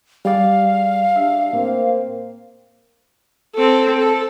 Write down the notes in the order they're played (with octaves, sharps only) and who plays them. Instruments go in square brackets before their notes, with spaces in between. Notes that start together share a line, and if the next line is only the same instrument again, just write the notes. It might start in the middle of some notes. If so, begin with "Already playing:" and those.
[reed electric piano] G3 G#4 D5 [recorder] F5
[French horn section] D4 G4 [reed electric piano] E5
[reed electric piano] A2 [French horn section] A#3 C4
[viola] C4 A4
A4